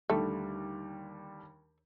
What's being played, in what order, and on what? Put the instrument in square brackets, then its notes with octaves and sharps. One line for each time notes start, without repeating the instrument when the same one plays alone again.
[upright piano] D#2 D3 G3 [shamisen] A3